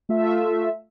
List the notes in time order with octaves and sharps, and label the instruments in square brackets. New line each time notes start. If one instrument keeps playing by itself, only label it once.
[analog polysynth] A3 F4 E5